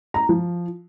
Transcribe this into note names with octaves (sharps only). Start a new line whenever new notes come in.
A#5
F3